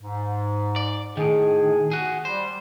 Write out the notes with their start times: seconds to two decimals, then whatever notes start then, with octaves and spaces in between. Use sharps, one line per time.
0.02 G#2
0.76 D5
1.17 A2 D#3 G#4
1.92 F#4 G#4
2.25 G3 C5